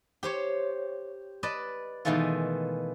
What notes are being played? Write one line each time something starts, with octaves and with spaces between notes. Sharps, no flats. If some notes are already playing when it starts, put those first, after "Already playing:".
G4 C5 C#5
B4 D5 D#5 A5
B2 D#3 E3 G#3 A3 F4